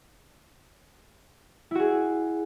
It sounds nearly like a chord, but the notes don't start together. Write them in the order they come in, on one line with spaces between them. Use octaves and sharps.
E4 F#4 G#4